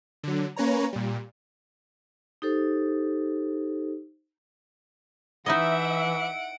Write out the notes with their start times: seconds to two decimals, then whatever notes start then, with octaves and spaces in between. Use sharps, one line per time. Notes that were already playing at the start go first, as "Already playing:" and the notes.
0.23 D3 F#3
0.56 A#3 C#4 B4 C#5 A#5
0.93 A#2 G3
2.42 D#4 G4 A4 C5
5.46 E3 D#4 E4 D#5 E5 F#5 D7